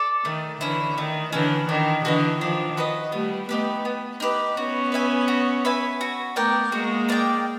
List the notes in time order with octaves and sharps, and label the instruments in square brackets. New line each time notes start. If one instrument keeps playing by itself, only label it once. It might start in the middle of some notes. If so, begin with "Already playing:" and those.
Already playing: [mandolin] A4 D5
[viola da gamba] D#3 [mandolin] A3
[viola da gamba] D3 E3 [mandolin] C#4 E4
[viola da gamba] D#3 [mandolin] A3
[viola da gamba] D3 E3 [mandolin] C#4 E4
[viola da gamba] D#3 [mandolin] D4
[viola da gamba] D3 E3 [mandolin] F#4 B4 D#5
[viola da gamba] D#3 F3 [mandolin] D4
[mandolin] F#4 B4 D#5
[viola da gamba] G3 A3 [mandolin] B3
[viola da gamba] A3 B3 [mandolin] D#4 G4 B4
[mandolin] B3
D#4 G4 B4
[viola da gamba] B3 C#4 [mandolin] F#4
[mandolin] B4 E5 G#5
F#4
B4 E5 G#5
F#4
[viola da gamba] A3 B3 [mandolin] A#4 D5 G5
[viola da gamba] G#3 A#3 [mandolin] F#4
[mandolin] A#4 D5 G5